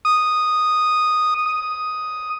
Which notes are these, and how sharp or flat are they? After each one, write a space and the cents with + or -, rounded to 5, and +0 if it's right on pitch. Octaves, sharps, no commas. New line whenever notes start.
D#6 -5
D#6 +5